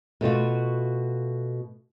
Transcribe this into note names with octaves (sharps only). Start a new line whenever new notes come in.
B2 A3 F4 F#4